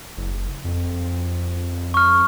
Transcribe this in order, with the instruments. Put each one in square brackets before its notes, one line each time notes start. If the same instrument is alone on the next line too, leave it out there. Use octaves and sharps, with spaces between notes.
[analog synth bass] F#1
F2
[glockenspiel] C#6 F6